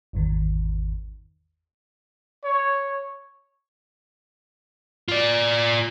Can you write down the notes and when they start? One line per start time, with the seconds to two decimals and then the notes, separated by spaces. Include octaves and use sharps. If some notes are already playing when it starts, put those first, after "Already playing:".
0.13 G#1 E2 D#3
2.44 C#5
5.08 F4 D5